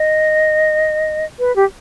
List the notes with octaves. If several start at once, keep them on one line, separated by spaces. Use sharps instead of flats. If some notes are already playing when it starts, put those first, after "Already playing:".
Already playing: D#5
B4
G4